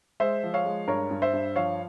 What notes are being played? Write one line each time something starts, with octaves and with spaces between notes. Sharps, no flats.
G#3 C5 E5
F3
C#5 F5
G#3
G2 A#4 C#5
G2
C5 E5
G2
F3 C#5 F5